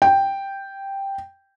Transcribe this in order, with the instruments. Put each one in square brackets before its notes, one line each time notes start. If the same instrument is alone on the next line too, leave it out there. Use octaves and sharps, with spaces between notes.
[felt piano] G5